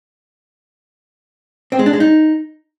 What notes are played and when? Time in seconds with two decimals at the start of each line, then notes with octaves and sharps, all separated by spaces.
1.72 C4
1.79 G#3
1.86 D4
1.93 G#3
2.00 D#4